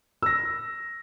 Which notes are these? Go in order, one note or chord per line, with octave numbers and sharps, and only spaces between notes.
E6 A#6